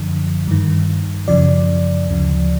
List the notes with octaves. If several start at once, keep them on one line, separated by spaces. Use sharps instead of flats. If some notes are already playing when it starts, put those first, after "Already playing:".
Already playing: F#2 D3 F3
G2 D#3
F#2 C#3 F3 D5
D2 C#3 F3